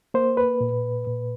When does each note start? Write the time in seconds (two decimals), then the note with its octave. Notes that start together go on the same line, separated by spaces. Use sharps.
0.14 A#3 C5
0.37 B4
0.61 A#2
1.07 A#2